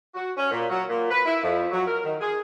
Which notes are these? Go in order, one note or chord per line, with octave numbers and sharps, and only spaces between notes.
F#4
C#4
A#2
F#3
A#2
B4
E4
F2
F#3
A#4
D#3
G#4